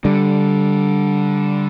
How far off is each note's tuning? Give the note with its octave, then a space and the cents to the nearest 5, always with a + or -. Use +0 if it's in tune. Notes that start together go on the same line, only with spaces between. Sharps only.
D3 -10 G3 +0